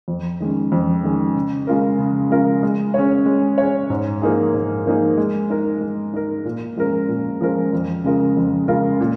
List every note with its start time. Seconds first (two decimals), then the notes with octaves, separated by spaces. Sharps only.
0.08 F2
0.40 D#3 G#3 C#4
0.72 F2
1.03 D#3 G#3 C#4
1.36 C#3
1.67 G#3 C#4 F4 A#4
1.99 C#3
2.30 G#3 C#4 F4 A#4
2.63 G#3
2.94 C#4 G#4 C#5
3.26 G#3
3.58 C#4 G#4 C#5
3.90 G#2
4.21 F3 A#3 D#4 G#4
4.54 G#2
4.86 F3 A#3 D#4 G#4
5.18 G#3
5.50 D#4 A#4
5.81 G#3
6.13 D#4 A#4
6.45 A#2
6.76 F3 G#3 C#4 A#4
7.08 A#2
7.41 F3 G#3 C#4 A#4
7.73 F2
8.04 C#3 G#3 F4 A#4
8.37 F2
8.68 C#3 G#3 F4 A#4
9.00 A#2